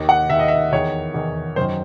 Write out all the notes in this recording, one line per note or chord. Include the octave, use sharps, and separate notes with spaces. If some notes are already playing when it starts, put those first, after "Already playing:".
Already playing: D#2 D#3
F#5
D#2 D#3 E5
D#5
E5
E2 D#3 C#5
E2 D#3
F#2 D#3 C5